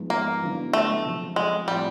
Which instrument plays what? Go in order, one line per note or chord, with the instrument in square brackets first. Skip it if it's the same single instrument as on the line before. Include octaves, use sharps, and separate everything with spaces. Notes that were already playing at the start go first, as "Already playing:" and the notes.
Already playing: [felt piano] G#2 F3 G#3 B3 D#4
[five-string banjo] A#3
[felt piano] D3 F#3 B3 E4
[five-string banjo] A3
[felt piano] C3 F3 G#3 C4
[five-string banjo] G#3
[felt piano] A2 F3 G#3 C4 F4 [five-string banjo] G3